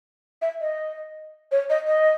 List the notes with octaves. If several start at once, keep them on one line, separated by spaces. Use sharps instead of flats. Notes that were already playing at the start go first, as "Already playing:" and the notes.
E5
D#5
C#5
D#5
D#5